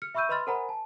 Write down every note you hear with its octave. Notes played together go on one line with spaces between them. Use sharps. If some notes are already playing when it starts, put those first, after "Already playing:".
F6 C#7
E5 B5 C#6 E6 G6 D#7
B4 D#5 B5 C6 F6 A6
A#4 C5 F#5 G#5 A#5 B5
A5